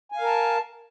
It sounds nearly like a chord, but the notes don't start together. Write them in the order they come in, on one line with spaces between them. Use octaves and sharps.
G#5 F5 A#4 A5